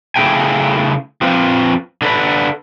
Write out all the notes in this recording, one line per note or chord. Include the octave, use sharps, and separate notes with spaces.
C#3 A3 E4 G#4 G5 G#5
F2 C4 F4 B4
D3 A4 B4